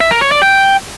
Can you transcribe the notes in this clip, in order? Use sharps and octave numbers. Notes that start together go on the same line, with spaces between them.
E5
A#4
C#5
D5
G5